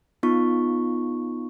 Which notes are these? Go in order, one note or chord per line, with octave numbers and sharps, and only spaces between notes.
B3 D#4 F4 C#6